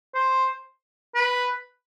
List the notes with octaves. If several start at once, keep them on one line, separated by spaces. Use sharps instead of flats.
C5
B4